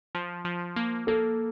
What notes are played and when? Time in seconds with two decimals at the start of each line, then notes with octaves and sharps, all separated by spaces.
0.15 F3
0.45 F3
0.76 A#3
1.07 A#3 A4